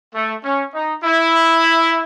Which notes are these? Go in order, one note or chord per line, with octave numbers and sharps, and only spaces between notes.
A3
C#4
D#4
E4